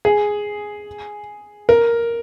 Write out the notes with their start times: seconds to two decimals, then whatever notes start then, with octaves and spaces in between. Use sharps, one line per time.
0.05 G#4
1.69 A#4